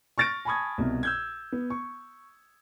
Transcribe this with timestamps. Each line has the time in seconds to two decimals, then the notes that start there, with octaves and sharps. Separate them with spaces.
0.18 C#6 F6 A6 A#6 D7
0.45 G#5 A5 B5 C#6 D#6 G#6
0.78 C2 B2
1.03 E6 G6 G#6
1.52 B3
1.70 C#6